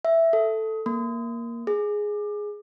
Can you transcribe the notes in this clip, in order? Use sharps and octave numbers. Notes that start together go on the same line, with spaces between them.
E5
A4
A#3
G#4